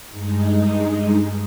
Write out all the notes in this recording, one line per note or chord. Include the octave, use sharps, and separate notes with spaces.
G2 G#3 D#4